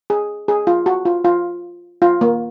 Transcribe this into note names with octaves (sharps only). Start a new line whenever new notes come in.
G#4
G#4
F4
F#4
F4
F4
F4
A#3